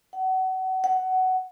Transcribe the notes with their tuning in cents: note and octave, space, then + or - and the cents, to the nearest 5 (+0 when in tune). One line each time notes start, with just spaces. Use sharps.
F#5 +30
F#5 +15